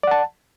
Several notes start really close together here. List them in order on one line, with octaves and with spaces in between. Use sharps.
D5 F#5 A5